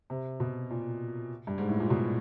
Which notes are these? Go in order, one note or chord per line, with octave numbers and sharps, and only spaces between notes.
C3
B2
A#2
G2
G#2
A2
A#2
B2